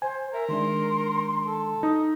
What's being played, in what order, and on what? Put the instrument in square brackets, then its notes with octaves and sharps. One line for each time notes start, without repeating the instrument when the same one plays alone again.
[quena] C5 [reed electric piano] G#5
[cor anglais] A#4 [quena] E5
[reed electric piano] D#3 G#3 D4 [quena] C6
[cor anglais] A4
[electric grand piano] D#4 [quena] D#6